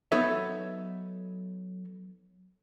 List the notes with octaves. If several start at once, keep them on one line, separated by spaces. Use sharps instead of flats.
F#3 B3 D#4 A4 C#5 E5